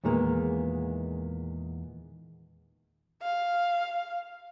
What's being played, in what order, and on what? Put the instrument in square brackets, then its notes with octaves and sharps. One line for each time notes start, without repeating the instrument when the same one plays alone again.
[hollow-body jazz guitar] E2 A#2 D#3 G#3 A#3 B3
[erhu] F5